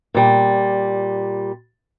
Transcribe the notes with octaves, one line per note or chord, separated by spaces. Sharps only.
A#2 G3